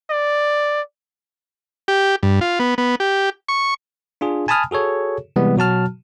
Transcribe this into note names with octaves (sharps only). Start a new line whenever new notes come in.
D5
G4
G2
F4
B3
B3
G4
C#6
D4 F4 G#4
G#5 A5 B5 D#6 F6
F#4 G#4 A4 C#5
C3 E3 G3 G#3 B3
B2 F#3 F#4 A5 F6